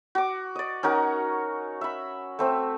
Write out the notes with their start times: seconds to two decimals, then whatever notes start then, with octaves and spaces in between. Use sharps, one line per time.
0.15 F#4 D6
0.55 D5 D#5
0.83 C#4 D#4 F#4 A#4
1.81 E5 B5
2.39 A3 C4 E5